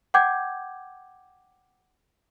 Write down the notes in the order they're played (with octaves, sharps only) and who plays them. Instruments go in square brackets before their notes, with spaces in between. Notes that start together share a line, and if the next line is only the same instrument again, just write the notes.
[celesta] F#5 G5 D6 G6 G#6